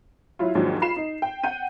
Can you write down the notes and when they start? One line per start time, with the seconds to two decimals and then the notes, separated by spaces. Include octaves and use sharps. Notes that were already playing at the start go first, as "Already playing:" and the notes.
0.39 F#3 E4 F4
0.55 D#2 G#2 F3 F#3 D4
0.82 F4 B5 C7 E7
0.96 D#4
1.22 G5
1.43 F#5 G5 G6 D#7